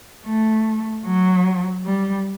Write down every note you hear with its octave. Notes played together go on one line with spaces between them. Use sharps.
A3
F#3
G3